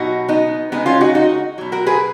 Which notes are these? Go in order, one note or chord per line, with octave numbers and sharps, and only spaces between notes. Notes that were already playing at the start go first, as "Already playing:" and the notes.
Already playing: B2 F#3 D#4 F#4
B3 D#4
C#3 G#3 B3 D#4
C#4 F4
D#4 F#4
D#4 F#4
B2 F#3
F#4 A#4
G#4 B4